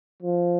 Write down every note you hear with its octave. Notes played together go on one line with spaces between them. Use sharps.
F3